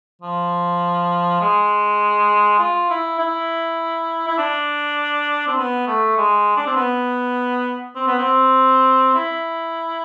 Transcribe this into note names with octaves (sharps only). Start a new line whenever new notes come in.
F3
G#3
F4
E4
E4
E4
D4
C4
B3
A3
G#3
D4
C4
B3
C4
B3
C4
E4